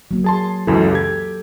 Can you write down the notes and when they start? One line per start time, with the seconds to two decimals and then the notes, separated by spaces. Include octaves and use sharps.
0.11 F#3 A#3
0.24 G#4 A5 C6
0.67 C#2 F#2 E3 A4
0.92 G4 G#6